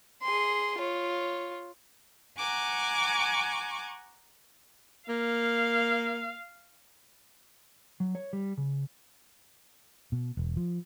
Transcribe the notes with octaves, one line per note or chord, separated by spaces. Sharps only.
G#4 C6
F4 C#5
F#5 G#5 A#5 C#6 D6
A#3 F5
F#3
C#5
G3
C#3
B2
E1
F3